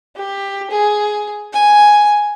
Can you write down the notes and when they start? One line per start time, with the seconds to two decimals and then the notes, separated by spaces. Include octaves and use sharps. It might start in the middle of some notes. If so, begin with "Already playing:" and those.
0.16 G4
0.70 G#4
1.53 G#5